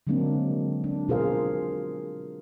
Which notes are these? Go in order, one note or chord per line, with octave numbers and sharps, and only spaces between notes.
D3 F#3 G#3 A#3 C4 D4
D4
B2 F4 G#4 A#4 C5 F5